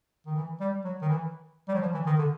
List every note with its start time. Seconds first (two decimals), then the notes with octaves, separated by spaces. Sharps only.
0.26 D#3
0.36 E3
0.60 G3
0.85 F#3
1.02 D#3
1.09 E3
1.68 G3
1.74 F#3
1.82 F3
1.94 E3
2.06 D#3
2.19 D3